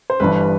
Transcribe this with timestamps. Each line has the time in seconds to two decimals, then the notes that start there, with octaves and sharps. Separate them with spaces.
0.10 C5
0.20 G1 G2 E3 B4